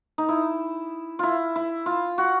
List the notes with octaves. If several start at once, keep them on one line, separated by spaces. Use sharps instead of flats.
D#4
E4
E4 F4
E4
F4
F#4